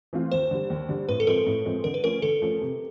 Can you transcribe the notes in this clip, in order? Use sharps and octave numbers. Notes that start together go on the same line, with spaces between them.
E3 A3 C4 F4
D#2 C5
D3 G3
D#2
D3 G3
A2 B4
A4
F3 G#3 C4 A#4
A2
F3 G#3 C4
D3 A#4
B4
F3 A3 C#4 A#4
D3 A4
F3 A3 C#4
C3